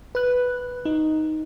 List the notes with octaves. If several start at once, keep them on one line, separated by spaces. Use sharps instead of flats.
B4 F#6
D#4